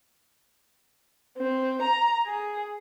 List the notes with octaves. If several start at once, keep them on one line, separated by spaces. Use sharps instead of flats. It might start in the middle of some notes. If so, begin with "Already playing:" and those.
C4
A#5
G#4